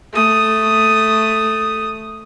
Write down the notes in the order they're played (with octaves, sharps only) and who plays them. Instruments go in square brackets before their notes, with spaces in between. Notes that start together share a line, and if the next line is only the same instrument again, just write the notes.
[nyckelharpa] A3 D#6